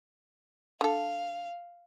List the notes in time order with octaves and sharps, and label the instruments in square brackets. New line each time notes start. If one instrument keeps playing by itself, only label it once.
[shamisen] D3 A4 [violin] F5